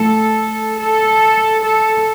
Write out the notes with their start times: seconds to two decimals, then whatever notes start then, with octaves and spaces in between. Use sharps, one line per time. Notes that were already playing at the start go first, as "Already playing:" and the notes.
Already playing: A2 F3 A3 A4
0.79 A4
1.62 A4